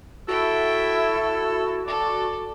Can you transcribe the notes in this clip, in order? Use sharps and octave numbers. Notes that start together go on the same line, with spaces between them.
E4 F#4 A4 E5 G5
A4 D5